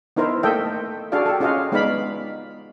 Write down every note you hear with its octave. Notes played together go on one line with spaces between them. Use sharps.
B3 D#4 E4 A#4 C5
A3 A#3 A4 D#5 E5 G5
D4 F#4 G#4 A4 D5 F5
G4 A4
C#4 F4 G#4 D#5 F5 F#5
G#3 B3 D#4 D5 F5 B5